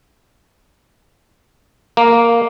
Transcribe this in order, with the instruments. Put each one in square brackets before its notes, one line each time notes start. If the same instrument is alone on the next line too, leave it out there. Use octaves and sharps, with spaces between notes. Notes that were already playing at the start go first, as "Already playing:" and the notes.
[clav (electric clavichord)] A#3